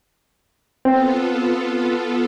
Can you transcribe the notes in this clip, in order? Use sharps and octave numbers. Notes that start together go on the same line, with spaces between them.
B3 C4 F4 A4